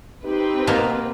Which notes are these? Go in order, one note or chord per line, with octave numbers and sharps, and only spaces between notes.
C4 D#4 G4 B4
B2 A#3